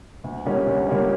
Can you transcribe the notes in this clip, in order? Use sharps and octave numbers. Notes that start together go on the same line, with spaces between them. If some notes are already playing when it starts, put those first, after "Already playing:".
D2
D3 G3 A#3 C#4
D2
D3 G3 A#3 C#4